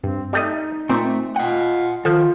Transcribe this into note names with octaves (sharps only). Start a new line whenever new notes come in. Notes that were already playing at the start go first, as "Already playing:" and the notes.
G2 C4
G3 A3 D#4 D#5
A#2 A3 C4
F4 D#5 F#5 G5
D#3 F3 F4 A4